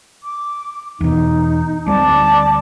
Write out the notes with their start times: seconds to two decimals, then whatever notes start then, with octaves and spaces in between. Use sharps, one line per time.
0.23 D6
1.01 E2 B2 D#4
1.86 D2 G3 C4 D5 A5 D6